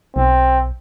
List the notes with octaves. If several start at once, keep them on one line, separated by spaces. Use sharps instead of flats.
B1 C4